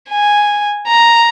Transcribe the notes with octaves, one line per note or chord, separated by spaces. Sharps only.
G#5
A#5